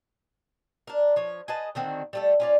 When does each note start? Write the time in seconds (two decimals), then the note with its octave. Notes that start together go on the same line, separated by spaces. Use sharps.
0.87 D4 A#4
1.16 F3 C#5
1.48 G#4 B4 D#5 A5
1.75 D3 D#3 C4 F#4
2.13 G3 A3 A4
2.40 C#4 F4 D5